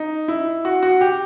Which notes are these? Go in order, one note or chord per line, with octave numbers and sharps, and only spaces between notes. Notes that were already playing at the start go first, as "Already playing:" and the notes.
Already playing: D#4
E4
F#4
F#4
G4